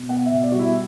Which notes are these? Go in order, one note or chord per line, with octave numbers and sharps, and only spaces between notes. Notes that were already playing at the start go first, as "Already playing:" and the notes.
Already playing: B2
B3 F#5
E5
B2
D5
G3 F#4
E4